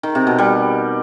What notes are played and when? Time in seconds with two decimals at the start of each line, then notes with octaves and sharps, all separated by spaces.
0.03 D#3
0.15 C3
0.27 B2
0.38 G3